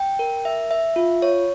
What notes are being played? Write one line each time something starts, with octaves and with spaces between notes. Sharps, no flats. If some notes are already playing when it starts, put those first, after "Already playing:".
Already playing: G5
A#4
E5
E5
F4
C#5